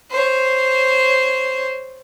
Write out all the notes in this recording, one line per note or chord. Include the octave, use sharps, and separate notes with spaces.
C5 C#5